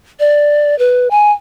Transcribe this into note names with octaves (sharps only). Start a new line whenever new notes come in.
D5
B4
G#5